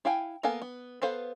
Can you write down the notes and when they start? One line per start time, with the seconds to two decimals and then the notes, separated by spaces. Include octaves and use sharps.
0.05 E4 F5 G5 G#5
0.43 A#3 B3 A4 F5 G#5
0.62 B3
1.02 B3 A4 B4 C5 F5